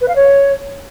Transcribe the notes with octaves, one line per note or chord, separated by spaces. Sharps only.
B4
F5
C#5